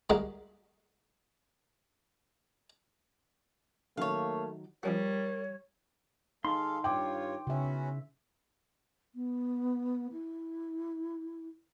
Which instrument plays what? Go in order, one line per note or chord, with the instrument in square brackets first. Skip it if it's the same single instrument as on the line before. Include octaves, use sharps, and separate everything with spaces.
[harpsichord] G3 G#3 A#3 F#4 D#5
[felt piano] D#3 F#3 [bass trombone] A3 [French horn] A#3 [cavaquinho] C#5 F5
[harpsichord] F3 C#4 F#4 [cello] G3 [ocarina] A#4 [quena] C#5
[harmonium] G#3 A4 F5 [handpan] D#4 [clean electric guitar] C6
[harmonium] G2 F4 C#5 [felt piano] G5 D6
[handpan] C#3 E5 [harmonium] B3 C#4 F#4
[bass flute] B3
E4